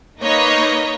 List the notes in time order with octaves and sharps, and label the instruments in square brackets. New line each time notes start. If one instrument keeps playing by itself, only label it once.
[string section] A#3 D#4 B4 C#5 D#5 A#5